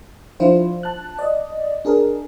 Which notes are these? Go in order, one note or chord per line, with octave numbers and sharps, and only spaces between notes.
F3 D4 E4 F4 C5
A5 F#6
D5 D#5
D4 G#4 A#4